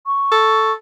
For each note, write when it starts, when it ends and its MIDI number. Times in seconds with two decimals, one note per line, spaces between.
0.06 0.72 85
0.32 0.74 69